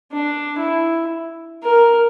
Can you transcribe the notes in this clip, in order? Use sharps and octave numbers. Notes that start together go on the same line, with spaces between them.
D4
E4
A#4